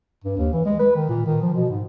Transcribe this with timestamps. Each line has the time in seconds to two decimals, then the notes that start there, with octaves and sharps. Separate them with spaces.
0.24 G2
0.38 D#2
0.53 E3
0.65 G#3
0.79 B4
0.95 D#3
1.09 A#2
1.26 D#3
1.42 F3
1.55 B2
1.70 G#2